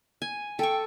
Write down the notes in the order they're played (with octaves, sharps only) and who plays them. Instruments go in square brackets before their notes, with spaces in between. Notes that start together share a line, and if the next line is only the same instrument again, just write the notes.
[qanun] G#5
[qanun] A4 C#6 [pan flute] G5